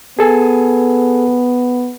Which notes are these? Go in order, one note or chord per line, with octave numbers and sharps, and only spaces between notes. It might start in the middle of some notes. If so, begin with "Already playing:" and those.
B3 G#4 A4 G#5